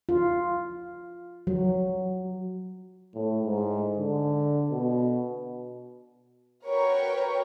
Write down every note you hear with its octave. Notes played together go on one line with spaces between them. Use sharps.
F4
F#3
A2
G#2
D3
B2
F#4 A#4 B4 C#5 G5 C#6